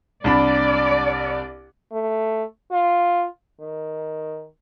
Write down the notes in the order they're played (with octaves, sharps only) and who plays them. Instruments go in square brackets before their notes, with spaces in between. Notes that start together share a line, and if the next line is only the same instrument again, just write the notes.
[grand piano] C2 D4 B5 [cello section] D5
[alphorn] A3
F4
D#3